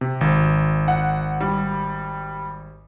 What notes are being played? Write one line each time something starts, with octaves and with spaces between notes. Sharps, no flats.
C3
G#1
F#5
G3